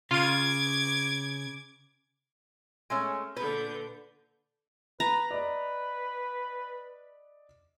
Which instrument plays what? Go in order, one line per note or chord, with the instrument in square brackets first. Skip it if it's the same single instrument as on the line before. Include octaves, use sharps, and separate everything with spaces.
[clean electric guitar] C#3 [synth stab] F4 D#7 [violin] D6 G#6
[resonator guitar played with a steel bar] G#3 A3 C#4
[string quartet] A#2 D3 G6 [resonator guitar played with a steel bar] B4
[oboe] B4 [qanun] A#5
[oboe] B4 [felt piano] D5 D#5